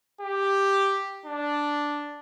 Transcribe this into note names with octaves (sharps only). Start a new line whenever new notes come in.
G4
D4